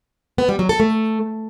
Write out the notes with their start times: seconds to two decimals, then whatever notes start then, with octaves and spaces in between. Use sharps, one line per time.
0.38 B3
0.49 G3
0.59 F#3
0.69 A4
0.80 A3